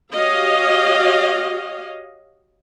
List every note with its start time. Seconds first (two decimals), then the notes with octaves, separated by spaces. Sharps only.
0.14 F#4 G4 C#5 D#5 F5